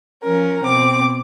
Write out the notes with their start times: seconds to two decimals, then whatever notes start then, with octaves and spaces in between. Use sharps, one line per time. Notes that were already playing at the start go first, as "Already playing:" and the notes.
0.24 F3 C#4 A#4
0.64 B2 C4 D6